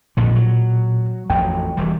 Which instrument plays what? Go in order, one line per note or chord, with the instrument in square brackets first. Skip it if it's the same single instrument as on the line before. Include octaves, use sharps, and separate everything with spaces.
[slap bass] A#1 F2 D3 [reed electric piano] A#2
[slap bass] F#3
[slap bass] A1 F2 F#3 [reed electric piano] G5
[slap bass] E1 E3 G3